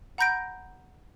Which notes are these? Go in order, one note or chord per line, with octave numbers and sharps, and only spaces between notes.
F#5 A#5 B5 G6 A#6 D7